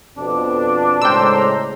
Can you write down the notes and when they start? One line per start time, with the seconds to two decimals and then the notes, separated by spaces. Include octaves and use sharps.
0.17 F2 B2 D4
1.02 A2 C#3 G#3 C5 G5 A#5 C6 E6